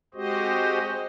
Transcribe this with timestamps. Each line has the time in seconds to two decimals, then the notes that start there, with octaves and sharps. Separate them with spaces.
0.14 G#3 C4 F#4 G4 C5 D#5